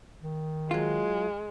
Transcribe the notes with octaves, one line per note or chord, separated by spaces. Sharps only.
D#3
F#3 G#3 F4